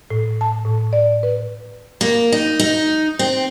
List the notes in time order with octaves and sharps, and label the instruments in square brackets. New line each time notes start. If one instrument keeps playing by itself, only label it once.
[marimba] A2
A5
A2
D5
B4
[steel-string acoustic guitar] A#3
D#4
D#4
C4